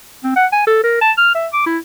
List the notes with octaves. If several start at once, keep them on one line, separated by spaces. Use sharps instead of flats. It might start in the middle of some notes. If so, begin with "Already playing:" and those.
C4
F#5
G#5
A4
A#4
A5
F6
E5
D6
E4